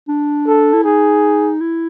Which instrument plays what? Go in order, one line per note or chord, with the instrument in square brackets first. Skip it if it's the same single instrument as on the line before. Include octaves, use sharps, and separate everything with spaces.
[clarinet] D4
[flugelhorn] A4
[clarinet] E4
[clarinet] D#4 [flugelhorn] G#4
[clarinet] E4